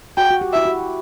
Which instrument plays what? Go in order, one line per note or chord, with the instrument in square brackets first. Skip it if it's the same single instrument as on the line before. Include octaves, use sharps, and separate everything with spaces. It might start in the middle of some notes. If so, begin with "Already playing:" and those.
[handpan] F#4 [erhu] G5
[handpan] F#4
G4
[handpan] E4 [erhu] E5
[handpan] F#4